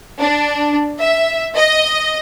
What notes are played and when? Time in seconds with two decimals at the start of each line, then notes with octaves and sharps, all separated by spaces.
0.19 D4
0.98 E5
1.55 D#5